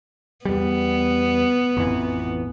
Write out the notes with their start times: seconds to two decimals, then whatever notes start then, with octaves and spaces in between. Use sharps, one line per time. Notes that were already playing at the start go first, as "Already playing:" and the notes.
0.45 E2 G3 B3
1.77 A1 F2 E3